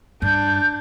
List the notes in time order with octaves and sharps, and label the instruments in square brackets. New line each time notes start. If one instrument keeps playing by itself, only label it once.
[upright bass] G2 [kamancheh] D4 [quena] G6